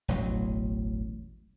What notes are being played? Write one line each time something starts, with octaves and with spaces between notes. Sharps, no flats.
E1 A1 F#3